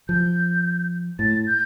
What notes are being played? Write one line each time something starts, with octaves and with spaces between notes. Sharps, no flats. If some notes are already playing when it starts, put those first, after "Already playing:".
F3 G6
A2 A6
G6